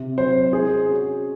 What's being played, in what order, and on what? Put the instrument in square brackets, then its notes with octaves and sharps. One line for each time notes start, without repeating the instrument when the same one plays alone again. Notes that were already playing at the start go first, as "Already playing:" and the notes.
Already playing: [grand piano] C3
[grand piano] F#3 C4 [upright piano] C5
[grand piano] G#3 [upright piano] G#4
[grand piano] C#4 F#4